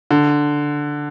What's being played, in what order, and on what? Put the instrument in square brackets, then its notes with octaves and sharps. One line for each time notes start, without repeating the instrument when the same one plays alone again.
[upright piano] D3